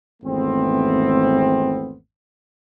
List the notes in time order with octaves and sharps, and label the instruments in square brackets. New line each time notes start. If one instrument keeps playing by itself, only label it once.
[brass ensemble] G#1 E2 A3 B3 C4